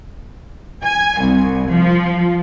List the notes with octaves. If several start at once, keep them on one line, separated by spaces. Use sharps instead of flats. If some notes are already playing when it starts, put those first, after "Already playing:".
G#5
C2
F3